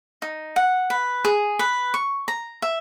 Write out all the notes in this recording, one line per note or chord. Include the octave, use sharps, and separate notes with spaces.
D#4
F#5
B4
G#4
B4
C#6
A#5
E5